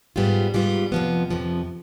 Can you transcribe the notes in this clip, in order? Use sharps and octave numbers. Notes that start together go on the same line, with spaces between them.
G#2 G3 B3 F4
G#2 G3 B3 F4
F2 C3 F3 B3
F2 C3 F3 B3